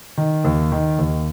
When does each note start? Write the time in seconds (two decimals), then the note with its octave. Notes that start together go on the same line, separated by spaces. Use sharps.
0.17 D#3
0.45 D#2
0.72 D#3
0.99 D#2